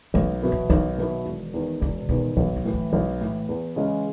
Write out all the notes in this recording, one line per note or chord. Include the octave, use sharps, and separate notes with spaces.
B1 A3
B2 F#3 B3 E4
E3
B1 D#3
B2 F#3 B3 E4
E1
E2 D#3
E1 C#3
E2 B2 D#3
B1 B2
D#3
A2 E3
F#3
B1 G#3
A2 E3
E2
C#3 E3 G#3 C#4